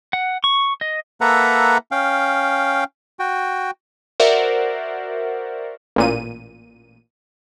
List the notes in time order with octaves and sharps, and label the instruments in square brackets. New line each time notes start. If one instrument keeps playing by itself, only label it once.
[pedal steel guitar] F#5
C#6
D#5
[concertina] A#3 A4 B4 E5 F#5 A#5
C#4 F5 G5
F#4 G5
[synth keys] F#4 A#4 C5 D5 E5 F#5
[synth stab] A1 A#2 D#7